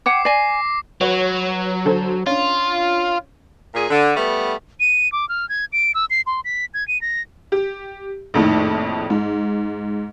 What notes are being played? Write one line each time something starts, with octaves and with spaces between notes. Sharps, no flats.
C#5 F#5 G5 D6 C7
D5 G#5 A#6 C7
F#3 F#4 B4 C#5
D3 A4 C5
C#4 D4 F4
A#2 G#4
D3
G3 A3 B3
D#7
D6
F6
G#6
D7
E6
C7
C6
B6
G#6
D#7
A#6
G4
A#1 F2 A2 D#3
G#2